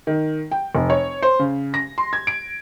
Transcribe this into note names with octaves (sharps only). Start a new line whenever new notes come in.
D#3
G5
F1
C#5
C5
C#3
A#6
C6
G#6
D7